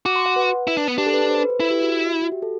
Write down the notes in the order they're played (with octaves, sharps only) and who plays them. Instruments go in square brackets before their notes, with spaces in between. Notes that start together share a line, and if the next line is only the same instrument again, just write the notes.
[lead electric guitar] F#4 [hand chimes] D6
[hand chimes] C6
F#5
B4
[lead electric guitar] E4
D4
B3
[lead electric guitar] D4 [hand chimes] G4
[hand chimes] A4
B4
C5
B4
B4
[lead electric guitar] E4 [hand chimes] A4
[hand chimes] G4
F#4
E5
F#4
G4
A4